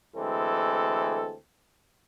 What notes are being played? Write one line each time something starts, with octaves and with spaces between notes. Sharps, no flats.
D2 E3 G#3 C4 A4